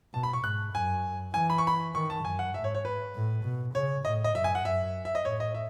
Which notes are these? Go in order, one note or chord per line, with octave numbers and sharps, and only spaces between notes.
B2 A5
B5
C#6
G#2 F#6
F#2 G#5
E3 G#5
B5
C#6
B5
D#3 C#6
A5
F#2 G#5
F#5
G#2 E5
C#5
C#5
B4
A2
B2
C#3 C#5
A2 D#5
D#5
F#2 E5
G#5
F#5
F#2 E5
E5
D#5
A2 C#5
D#5
E5